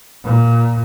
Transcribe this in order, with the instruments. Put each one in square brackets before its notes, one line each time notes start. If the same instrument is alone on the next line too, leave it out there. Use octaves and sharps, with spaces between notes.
[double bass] A#2